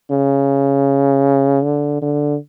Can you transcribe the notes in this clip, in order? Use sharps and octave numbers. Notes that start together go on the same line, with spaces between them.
C#3
D3
D3